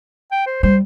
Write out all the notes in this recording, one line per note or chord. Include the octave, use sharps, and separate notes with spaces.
G5
C5
G3 C5